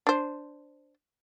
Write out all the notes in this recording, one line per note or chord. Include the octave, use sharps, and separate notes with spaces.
D4 C5